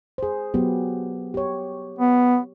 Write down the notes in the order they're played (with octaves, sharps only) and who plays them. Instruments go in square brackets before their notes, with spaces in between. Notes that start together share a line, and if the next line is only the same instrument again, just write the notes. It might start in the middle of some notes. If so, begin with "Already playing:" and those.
[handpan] G#4 C5
F#3 B3 G4
G4 C#5
[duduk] B3